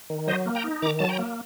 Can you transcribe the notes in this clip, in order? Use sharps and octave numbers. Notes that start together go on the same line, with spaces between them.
D#3
F#3 C5 D#5
A#3
G5 A#5
D#4
D#3 A#5 D6
F#3 A5
G5 A#5
A#3